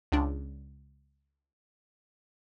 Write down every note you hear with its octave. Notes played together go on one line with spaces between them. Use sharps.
C#2 D4